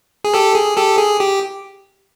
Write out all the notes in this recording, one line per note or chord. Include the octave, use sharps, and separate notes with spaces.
G#4
G4 A4
G#4
G4 A4
G#4
G4